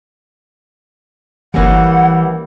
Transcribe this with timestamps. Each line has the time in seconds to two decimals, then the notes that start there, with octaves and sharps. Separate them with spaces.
1.54 G1 E3 G3 A#3 C#4 F#5 A#6 C#7